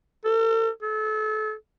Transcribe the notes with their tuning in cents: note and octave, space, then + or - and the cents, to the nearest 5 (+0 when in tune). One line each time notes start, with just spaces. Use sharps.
A4 +45
A4 -30